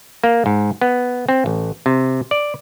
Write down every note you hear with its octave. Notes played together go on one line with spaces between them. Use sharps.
A#3
G#2
B3
C4
A1
C3
D5